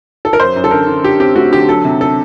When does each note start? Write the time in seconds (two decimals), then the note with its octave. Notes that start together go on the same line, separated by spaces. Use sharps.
0.25 A4
0.33 A#4
0.40 F#2 C5
0.56 F#2
0.64 A4
0.71 D3 A#4
0.87 D3
1.04 D3 G4
1.20 C4 G4
1.35 A3 F#4
1.52 D3 G4
1.68 F#3 A4
1.85 C3
2.01 A4